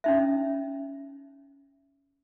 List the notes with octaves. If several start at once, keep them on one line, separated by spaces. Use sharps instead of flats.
C#4 D#4 E5